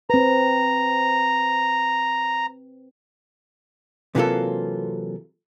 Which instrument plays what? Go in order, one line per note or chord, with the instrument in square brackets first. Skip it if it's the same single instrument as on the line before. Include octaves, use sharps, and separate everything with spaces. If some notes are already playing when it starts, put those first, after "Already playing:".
[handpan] C4 B4 [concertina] A#5
[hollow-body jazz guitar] C3 E3 F#3 A#3 F4 A4